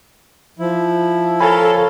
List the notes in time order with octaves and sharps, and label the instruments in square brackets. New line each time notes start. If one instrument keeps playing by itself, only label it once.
[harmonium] F3 [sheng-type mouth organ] E4
[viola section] A4 [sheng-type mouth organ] A#4 C#5 F5 [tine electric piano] G#5 B5